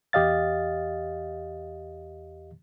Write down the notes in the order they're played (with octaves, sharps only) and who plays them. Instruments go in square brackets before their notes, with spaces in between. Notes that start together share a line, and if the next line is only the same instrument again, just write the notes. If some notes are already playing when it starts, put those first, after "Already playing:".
[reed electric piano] E2 G4 D#5 F5 A6